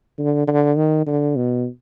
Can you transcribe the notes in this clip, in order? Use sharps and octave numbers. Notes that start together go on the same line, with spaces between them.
D3
D3
D#3
D3
B2